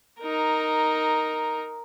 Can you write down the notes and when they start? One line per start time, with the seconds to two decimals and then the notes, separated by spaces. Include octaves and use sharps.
0.20 D#4 A#4